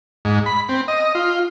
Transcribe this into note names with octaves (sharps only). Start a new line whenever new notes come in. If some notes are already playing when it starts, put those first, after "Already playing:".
G#2
B5
C4
D#5
F4